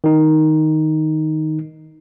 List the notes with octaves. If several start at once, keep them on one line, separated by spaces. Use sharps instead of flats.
D#3 D#4